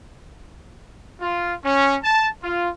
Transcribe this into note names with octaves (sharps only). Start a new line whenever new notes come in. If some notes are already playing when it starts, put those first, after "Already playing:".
F4
C#4
A5
F4